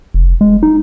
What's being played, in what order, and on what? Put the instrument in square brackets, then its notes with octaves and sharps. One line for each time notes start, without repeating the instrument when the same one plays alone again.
[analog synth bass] F1
G#3
D#4